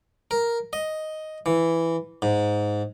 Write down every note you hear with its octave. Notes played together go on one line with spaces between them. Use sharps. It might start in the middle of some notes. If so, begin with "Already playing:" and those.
A#4
D#5
E3
G#2